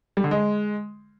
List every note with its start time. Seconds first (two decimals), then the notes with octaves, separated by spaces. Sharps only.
0.17 G3
0.24 D3
0.31 G#3